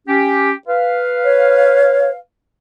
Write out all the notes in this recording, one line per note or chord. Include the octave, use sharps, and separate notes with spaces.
C#4 G4
B4 F5
C#5